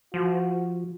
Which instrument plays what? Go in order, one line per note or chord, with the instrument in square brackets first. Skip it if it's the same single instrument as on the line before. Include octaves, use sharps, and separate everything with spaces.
[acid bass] F3 [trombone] F#4